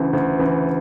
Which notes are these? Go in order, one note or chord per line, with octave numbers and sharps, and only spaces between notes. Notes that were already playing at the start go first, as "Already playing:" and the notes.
Already playing: D2 C#3 E3
D2
C#3 E3